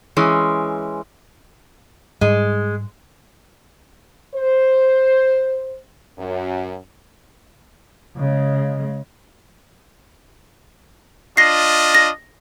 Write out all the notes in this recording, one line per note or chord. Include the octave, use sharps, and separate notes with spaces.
E3 G#3 C#4
G#2 G3 G#3
C5
F#2
C#3 G#3
D4 F4 D#5 A#6 C7
A#6